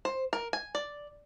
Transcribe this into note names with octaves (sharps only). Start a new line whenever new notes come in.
C5
A#4
G#5
D5